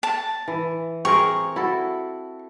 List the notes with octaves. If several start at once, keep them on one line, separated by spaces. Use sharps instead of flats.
A5
E3
C4 G#4 A#4 C#6
E4 F#4 A4